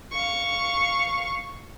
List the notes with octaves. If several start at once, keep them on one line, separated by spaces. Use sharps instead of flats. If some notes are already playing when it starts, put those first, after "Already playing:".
F5 C#6